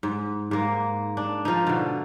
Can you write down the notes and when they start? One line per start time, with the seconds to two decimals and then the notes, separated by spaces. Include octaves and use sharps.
0.03 G#2
0.51 G#2 A#3
1.17 D4
1.45 F3 D#4
1.67 B2 D3